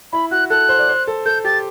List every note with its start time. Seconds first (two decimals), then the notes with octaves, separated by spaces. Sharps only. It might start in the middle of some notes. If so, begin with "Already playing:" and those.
0.13 E4 B5
0.31 F#4 F#6
0.50 A4 F#6
0.69 C5
0.79 D5
0.89 C5
1.07 A4
1.26 A4 G6
1.45 G4 A6